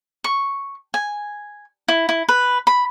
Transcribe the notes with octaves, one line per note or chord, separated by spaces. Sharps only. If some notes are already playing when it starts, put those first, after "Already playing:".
C#6
G#5
E4
E4
B4
B5